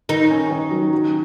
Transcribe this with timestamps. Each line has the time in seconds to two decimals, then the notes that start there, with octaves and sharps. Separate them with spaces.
0.09 D#3 D#4
0.30 C#4
0.50 D#3
0.71 F#3
0.93 F#4